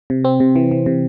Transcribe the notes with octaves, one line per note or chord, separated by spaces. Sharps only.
C3
C4
C3
E3
E3
C3